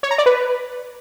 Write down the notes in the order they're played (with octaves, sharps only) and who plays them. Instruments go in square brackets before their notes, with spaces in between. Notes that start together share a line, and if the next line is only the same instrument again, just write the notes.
[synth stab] C#5
A#5
D5
B4